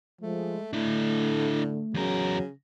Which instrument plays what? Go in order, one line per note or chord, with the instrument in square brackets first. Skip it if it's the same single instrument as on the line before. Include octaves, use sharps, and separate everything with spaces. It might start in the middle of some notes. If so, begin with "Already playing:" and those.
[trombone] F3 [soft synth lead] G#3 [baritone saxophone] A3
[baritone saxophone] A2 [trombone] D3 [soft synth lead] A3 [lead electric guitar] D4 E4
[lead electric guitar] E2 A#4 [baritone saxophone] C#3 [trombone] F#3